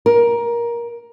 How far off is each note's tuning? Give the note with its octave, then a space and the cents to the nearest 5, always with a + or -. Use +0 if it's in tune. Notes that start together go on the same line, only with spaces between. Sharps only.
A#4 +15